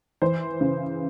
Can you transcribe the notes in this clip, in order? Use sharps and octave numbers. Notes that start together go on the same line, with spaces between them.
E3 C5
C#3